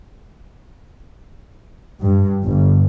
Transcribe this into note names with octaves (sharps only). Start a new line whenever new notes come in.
G2
G1